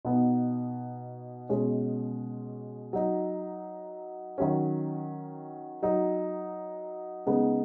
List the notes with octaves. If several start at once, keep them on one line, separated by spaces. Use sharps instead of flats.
B2 B3 D#4
B2 G#3 C#4
F#3 D#4
D#3 F#3 C#4
F#3 D#4
C#3 G#3 B3 D#4